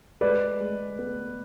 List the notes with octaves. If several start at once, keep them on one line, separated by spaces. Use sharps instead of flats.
G#3 B4 D5
G#3
B3